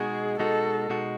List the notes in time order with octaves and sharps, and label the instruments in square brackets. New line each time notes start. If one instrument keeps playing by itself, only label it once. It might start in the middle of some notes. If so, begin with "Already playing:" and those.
Already playing: [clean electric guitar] B2 G#3 D#4 F#4 [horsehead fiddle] G#4
[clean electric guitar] B2 G#3 D#4 F#4 [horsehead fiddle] A4
[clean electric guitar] B2 G#3 D#4 F#4